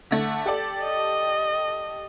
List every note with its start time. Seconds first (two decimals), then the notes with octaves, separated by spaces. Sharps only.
0.11 D3 A3
0.46 G4 A4 D5
0.84 D#5